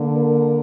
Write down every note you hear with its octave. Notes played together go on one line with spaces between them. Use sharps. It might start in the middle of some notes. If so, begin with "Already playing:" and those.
Already playing: D3 A#3
A#4